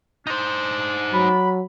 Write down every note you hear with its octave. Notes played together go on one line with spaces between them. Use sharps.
D4 D#4 C5
F#3 B5